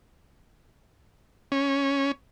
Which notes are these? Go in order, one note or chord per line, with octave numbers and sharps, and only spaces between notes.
C#4